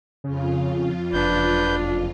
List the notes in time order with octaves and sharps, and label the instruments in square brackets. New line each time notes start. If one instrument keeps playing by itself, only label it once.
[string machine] F2 F4 [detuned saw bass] C#3
[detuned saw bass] F#1 [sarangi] D4 [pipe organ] B4 G6